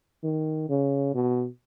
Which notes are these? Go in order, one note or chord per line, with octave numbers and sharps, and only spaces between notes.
D#3
C#3
B2